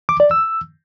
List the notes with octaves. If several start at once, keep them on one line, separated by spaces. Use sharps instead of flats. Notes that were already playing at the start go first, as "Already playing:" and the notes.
D6
D5
E6